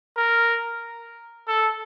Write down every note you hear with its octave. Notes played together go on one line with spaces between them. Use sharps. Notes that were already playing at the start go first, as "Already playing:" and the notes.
A#4
A4